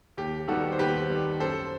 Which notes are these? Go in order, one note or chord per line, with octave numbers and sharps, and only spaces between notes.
D#2 G4
D#3 G3 B3 F#4 A4
C5
D#2 G4 B4
D#3 G3 B3
F#2 A4 C5